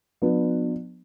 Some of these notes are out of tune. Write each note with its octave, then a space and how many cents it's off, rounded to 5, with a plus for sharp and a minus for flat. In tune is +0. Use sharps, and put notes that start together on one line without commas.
F3 +45 B3 +0 D4 +30